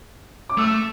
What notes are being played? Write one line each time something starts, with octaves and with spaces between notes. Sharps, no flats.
D6
A3 E6